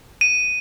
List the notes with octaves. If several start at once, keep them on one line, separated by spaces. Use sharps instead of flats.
D#7